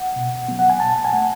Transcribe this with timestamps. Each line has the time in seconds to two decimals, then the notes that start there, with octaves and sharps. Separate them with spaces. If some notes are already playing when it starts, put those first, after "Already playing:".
Already playing: F#5
0.16 B2
0.48 F#3 B3
0.59 F#5
0.70 G#5
0.80 B2 A5
0.96 A5
1.05 G#5
1.13 A3 F#5